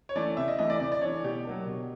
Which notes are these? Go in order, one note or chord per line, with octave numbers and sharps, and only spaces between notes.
C#5
E3 A3 C#4 D5
C3 E5
D#5
E3 A3 D#5
D5
C3 D5
D5
E3 A3 C#5
B2 G4
F#3 A#3 D4
B2